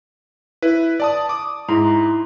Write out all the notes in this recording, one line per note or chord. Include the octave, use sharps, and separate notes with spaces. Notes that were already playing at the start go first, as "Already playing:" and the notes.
E4 B4
D5 A5 D#6
D6 D#6
G#2 E4 A#5 C6